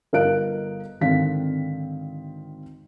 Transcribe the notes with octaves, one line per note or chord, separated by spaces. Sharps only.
G1 A#4 D#5 F5 F#6 D7
G#1 D3 D#3 C4 F5 B6